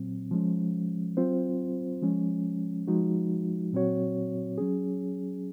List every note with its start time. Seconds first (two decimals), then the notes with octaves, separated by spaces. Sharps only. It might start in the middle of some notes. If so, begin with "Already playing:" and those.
Already playing: A#2 F#3 C4
0.31 F3 G#3 C#4
1.17 F#3 C4 F4 C5
2.02 F3 G#3 C#4
2.87 F3 G#3 D#4 F#4
3.73 A#2 F#3 C4 F#4 C#5
4.58 F#3 C#4 G#4